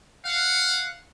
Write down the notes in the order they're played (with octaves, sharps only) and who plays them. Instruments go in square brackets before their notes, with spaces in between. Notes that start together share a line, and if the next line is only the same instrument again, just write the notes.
[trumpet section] F5 F#5